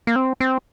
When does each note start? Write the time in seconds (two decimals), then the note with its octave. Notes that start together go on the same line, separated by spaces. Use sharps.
0.07 A#3
0.16 C4
0.40 C4